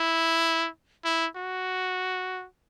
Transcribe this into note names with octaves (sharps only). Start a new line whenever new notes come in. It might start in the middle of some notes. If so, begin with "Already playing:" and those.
Already playing: E4
E4
F#4